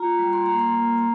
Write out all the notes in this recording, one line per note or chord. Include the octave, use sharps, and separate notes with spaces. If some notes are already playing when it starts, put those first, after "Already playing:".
Already playing: F4 A#5
G3
C6
A#3 A#5
C6
A#3
A#3 A#5